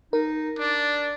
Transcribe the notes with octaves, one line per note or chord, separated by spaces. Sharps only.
D#4 A#4
D4 D5